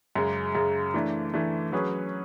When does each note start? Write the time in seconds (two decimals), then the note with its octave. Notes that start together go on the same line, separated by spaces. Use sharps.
0.16 F#2 C#3 G#3
0.55 F#2 C#3 G#3
0.94 E3 A3 D4
1.33 E3 A3 D4
1.72 F#3 C#4 G#4 B4